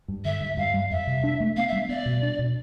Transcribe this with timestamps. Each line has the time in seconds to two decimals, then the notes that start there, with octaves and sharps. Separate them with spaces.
0.08 G2
0.24 D3 E5
0.41 G2
0.57 G2 F5
0.74 G3
0.91 F2 E5
1.07 C3
1.24 D4
1.40 A3
1.56 B3 F5
1.68 E5
1.72 G3
1.89 B3 D5
2.06 B2
2.22 D4
2.39 B2